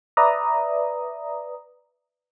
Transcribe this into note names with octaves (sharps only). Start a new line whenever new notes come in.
B4 D5 E5 A#5 D#6